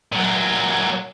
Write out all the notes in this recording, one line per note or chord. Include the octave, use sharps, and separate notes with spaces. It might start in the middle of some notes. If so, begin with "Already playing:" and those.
A#2 F#3